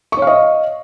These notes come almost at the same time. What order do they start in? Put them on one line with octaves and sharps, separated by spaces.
C#6 C#5 F5 D#5